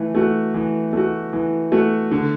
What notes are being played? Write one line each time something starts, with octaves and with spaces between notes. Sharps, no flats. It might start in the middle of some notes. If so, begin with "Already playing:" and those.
Already playing: E3 A3
A3 F#4
E3
A3 F#4
E3
A3 F#4
D3